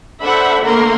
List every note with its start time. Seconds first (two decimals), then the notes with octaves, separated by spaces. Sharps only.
0.22 D4 A4 C5 E5 F#5 B5
0.64 D3 A3 A#3 A#4 A#5 C6